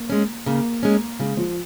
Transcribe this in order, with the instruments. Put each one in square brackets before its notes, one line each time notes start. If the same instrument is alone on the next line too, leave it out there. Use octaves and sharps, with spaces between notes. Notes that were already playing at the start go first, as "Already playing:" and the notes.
Already playing: [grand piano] A#3
[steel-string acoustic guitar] G#3 C#4
[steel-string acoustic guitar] C#3 [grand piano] A#3
[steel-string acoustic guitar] G#3 C#4
[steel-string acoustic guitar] C#3 [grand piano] G#3
[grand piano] F3